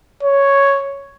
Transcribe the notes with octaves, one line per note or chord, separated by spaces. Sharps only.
C#5